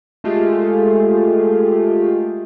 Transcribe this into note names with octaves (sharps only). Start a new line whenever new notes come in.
G#3 A3 F4 G4 G#4